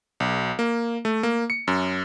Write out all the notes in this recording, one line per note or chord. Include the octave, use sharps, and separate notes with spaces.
B1
A#3
A3
A#3
C#7
F#2